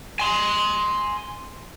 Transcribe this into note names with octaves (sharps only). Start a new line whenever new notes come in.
G#5 C6